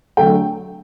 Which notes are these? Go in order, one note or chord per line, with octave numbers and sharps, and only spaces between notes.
D3 F#3 A3 G5